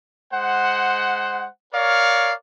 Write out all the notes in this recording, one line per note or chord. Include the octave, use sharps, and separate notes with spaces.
G#3 C5 F#5
A#4 C#5 D5 F5